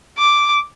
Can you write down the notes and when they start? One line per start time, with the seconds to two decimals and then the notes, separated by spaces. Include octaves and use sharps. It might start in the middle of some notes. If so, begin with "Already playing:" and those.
0.18 D6